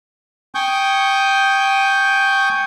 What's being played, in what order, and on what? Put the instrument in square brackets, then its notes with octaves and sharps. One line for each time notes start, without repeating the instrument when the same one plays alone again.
[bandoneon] G5 G#5 C#6 D#6 G6